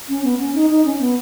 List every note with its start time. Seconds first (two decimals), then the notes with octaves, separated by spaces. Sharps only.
0.09 C#4
0.24 B3
0.39 C#4
0.55 D#4
0.70 D#4
0.85 C#4
1.00 B3